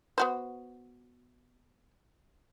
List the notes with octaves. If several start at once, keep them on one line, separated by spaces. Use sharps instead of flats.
B3 F#4 C5